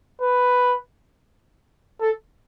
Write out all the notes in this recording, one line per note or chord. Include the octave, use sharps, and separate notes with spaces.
B4
A4